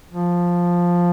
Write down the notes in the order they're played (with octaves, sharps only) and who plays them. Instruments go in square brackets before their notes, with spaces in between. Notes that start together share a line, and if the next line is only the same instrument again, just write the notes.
[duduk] F3